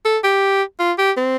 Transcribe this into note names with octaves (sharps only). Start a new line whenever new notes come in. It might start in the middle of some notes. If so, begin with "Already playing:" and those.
A4
G4
F4
G4
C4